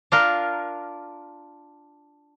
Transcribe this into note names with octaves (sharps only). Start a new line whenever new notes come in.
D4 F4 A#4